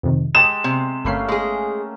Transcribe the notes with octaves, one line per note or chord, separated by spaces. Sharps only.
F2 C3 D#3
G#3 G4 A5 D#6 E7
C3
G1 A3 A#3 C#4 B5 C7
G#3 G#4